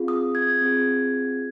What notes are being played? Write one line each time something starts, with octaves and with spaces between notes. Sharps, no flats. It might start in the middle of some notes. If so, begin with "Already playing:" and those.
Already playing: C4 F4 G#4
D#6
G#6
C4 F4 G#4